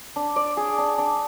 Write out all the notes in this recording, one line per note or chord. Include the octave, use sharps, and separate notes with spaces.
D4
D5
G#4
D4
D4